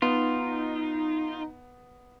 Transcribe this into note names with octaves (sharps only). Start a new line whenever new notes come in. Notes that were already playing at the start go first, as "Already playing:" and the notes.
B3 D#4 F4